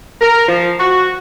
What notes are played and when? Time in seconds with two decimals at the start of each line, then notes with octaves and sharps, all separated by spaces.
0.21 A#4
0.48 F3
0.79 F#4